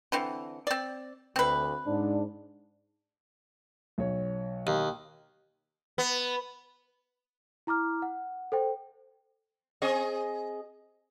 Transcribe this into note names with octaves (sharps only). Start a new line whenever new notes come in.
D3 E3 C4
C4 D5
D2 C4 B4
G#2 D4
B1 C#5
D#2
B3
E4 A#5 D6 F6
F#5
A4 C5 G5
C4 G#4 D#5